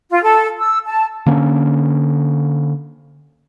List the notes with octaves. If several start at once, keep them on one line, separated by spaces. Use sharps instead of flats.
F4
A4
E6
A5
D3 A#3 C#4